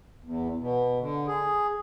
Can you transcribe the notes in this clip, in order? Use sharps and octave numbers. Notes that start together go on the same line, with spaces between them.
E2
B2
D3
G#4